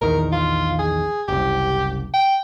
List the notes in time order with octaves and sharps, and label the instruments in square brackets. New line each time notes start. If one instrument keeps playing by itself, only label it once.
[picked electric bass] A#1 E2 D#3 [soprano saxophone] A#4
[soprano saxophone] F4
G#4
[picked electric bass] F#1 C2 [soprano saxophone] G4
[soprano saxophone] G5